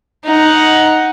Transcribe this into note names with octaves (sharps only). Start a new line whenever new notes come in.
D#4 F#5